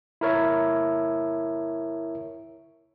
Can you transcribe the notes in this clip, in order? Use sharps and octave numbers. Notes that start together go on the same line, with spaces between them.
E4 A#4 C#5 E5